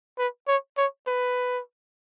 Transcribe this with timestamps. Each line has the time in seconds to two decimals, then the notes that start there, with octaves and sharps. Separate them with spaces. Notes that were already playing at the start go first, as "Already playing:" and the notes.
0.18 B4
0.47 C#5
0.78 C#5
1.07 B4